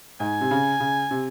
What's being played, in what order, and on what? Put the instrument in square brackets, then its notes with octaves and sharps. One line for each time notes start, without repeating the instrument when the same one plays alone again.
[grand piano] G#2 [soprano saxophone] G#5
[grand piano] C3
C#3
C#3
C3